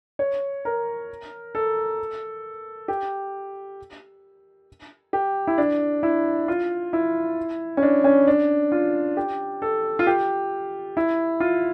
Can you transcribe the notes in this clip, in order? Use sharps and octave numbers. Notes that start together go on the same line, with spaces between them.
C#5
A#4
A4
G4
G4
E4
D4
E4
F4
E4
C#4
D4
C#4
D4
F4
G4
A4
F4
G4
E4
F4